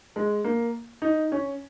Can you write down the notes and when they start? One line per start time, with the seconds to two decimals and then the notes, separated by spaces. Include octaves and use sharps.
0.16 G#3
0.44 A#3
1.02 D#4
1.32 C#4